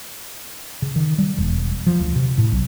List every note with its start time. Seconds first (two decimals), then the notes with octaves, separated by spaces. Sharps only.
0.82 C#3
0.96 D#3
1.18 G3
1.38 E1
1.87 F3
2.00 D2
2.16 C3
2.38 A2
2.52 B1